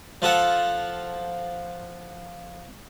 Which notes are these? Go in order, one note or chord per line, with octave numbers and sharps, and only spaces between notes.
F3 F4 A4 F#5